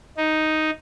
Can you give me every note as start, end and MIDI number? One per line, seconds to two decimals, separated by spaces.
0.17 0.71 63